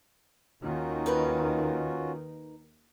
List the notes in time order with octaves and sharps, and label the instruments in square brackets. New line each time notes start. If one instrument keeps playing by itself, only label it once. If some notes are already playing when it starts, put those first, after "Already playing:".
[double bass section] D#2 D#3 [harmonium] C#4 F4 F#4
[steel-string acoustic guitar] D#4 A#4 B4